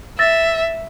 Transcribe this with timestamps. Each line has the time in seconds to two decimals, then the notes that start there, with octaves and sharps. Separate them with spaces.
0.19 E5 E6 A6 A#6